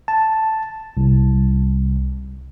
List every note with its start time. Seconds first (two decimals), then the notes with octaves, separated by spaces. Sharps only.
0.08 A5
0.97 C2